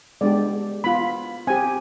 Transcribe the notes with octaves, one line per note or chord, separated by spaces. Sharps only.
G#3 B3 D4 G4 D5
B3 F4 B5
C4 G4 G#5